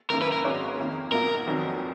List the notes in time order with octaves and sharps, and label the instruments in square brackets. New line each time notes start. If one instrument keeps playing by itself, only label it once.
[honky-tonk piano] F#1 F#2 D#3 A#3 [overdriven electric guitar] A#4
[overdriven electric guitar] B4
A#4
[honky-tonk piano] G#1 G#2 F#3 C#4 G#4
F2 D#3 A#3
[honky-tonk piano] B1 B2 A#3 F4 [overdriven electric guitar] A#4
[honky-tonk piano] F1 F2 D#3 F#3